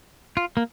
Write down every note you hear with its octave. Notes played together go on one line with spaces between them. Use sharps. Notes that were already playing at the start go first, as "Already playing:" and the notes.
F4
A#3